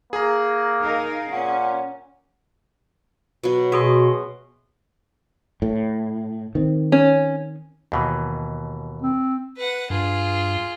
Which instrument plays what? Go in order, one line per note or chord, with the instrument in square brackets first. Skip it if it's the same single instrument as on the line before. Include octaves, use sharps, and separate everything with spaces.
[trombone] A#3 [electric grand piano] G#4 A#5
[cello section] D#4 A#4 F5
[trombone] A#2 [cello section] C#4 [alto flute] F#5
[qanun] B2 F#3
[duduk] B2 [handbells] F#4 G#4 C6 [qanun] E5
[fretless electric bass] A2
D#3 C4
[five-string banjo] C#4
[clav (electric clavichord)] D#2 B2 E3
[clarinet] C4
[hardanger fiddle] B4 F#5
[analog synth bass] G2 [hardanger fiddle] F4 G#4